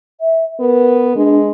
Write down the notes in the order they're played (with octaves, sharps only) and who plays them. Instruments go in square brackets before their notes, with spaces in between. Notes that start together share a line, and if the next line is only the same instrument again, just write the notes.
[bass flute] E5
[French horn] B3 [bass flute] A#4
[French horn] G#3 [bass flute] D4